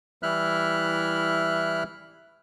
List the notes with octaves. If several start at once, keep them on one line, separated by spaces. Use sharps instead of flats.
E3 G3 E4 E5 F6 F#6